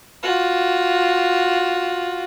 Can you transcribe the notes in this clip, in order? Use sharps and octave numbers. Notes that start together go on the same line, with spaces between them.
F4 F#4